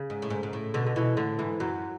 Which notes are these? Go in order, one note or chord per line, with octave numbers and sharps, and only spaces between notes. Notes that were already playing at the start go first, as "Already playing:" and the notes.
Already playing: C#3
G#2
A2
G#2
G#2
A2
B2 D3
D3
B2 E3
A2 D3
G#2 E3
F#2 F#3